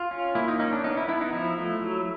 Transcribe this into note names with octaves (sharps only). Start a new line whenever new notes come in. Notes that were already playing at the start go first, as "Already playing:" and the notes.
Already playing: F4
C#4
A#3 E4
D#4
C#4 D#4
D4
B3 D#4
E4
B3 E4
D#4
F3 E4
A3
F#3